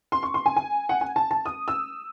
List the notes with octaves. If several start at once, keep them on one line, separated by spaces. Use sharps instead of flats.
C6
C#6
C6
G#5
G#5
F#5
G#5
A5
A5
D#6
E6